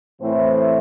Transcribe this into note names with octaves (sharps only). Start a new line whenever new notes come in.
A2 E3 A3 C4 C5